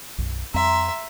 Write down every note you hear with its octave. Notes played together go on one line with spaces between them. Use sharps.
B1 F#2
F2 G3 C4 E5 A#5 C6